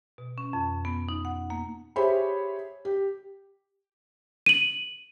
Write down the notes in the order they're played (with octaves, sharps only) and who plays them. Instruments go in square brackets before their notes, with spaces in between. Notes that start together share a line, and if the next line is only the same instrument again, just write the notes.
[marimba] B2
C#4
F2
B3
D#4
F#5
A#3
[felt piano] G4 G#4 C5 C#5 E5 B5
G4
[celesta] D#7 F#7